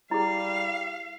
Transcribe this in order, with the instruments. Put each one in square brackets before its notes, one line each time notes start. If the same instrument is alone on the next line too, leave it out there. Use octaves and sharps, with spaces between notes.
[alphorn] G3 [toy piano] E4 G#4 [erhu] F5